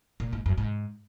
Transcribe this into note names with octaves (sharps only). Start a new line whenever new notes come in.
A#2
G#2
F#2
G#2